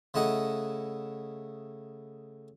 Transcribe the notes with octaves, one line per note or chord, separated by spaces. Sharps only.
C#3 A3 E4 D#5 F#5 D#6